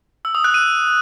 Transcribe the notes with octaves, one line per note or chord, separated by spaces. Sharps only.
E6
D#6
F#6
D#7